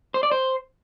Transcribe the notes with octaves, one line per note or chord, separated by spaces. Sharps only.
C5
D5
C5